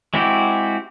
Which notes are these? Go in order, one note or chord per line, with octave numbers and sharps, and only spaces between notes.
G#3 C4 E4 F#4 G4